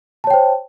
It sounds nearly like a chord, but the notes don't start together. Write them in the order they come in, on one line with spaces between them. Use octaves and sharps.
A5 C#5 G5 C5